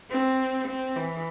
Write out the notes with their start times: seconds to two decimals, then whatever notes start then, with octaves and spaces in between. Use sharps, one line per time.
0.10 C4
0.68 C4
0.96 E3